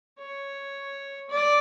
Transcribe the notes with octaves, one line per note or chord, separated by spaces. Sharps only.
C#5
D5